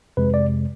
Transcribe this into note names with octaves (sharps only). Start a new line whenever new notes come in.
F2 C3 G#3 B4
D5